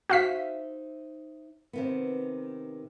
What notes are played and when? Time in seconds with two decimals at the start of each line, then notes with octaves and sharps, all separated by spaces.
0.09 D#4 F#4 C5 E5 F5 B6
1.73 C3 D#3 B3